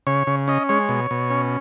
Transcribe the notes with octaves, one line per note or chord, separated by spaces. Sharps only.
C#3 C#5
C#3
C#4 D#5
G#3 C#5
B2
B2
C#4